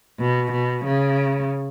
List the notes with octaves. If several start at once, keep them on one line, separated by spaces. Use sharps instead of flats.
B2
B2
C#3